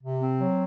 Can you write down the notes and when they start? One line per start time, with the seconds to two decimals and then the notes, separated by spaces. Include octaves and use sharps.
0.02 C3
0.21 C4
0.38 F#3